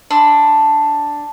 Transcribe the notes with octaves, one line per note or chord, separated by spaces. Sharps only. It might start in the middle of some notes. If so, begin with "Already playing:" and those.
D4 B5 C6 E6